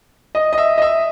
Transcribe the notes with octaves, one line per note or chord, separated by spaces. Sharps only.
D#5
D#5
E5
D#5
E5